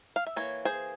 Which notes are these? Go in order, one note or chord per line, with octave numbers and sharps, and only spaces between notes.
F5
E5
E3 A#3 C#5
G#4 C5